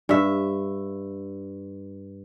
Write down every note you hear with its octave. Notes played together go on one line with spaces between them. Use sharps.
G2 E5